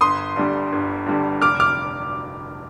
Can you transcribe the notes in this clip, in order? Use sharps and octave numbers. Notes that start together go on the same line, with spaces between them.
G1 C6 D#6
G2 D3 G3
G1
G2 D3 G3
F1 D6 F6
D6 F6